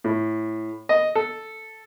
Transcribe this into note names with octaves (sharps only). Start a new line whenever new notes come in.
A2
D#5
A4